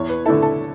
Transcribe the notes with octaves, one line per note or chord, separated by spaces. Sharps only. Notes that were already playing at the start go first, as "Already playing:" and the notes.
Already playing: E2 C#5
B4
D3 A3 E4 A4
A4